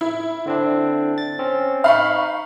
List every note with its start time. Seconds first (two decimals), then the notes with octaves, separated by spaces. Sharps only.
0.01 E4
0.46 D3 C4 D4
1.18 A6
1.39 C4 C#4
1.84 D#4 F5 B5 C#6